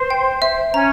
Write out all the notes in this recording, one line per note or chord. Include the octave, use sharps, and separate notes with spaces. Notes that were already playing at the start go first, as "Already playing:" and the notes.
Already playing: B4 C5
G5
E5
C#4 C#5 A#5